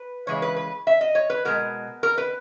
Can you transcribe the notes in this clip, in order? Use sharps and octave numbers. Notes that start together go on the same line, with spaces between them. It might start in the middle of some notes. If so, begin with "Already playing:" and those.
Already playing: B4
C#3 E3 G#3 C#5
B4
B4
E5
D#5
C#5
B4
B2 G#3 A#4
A#4
B4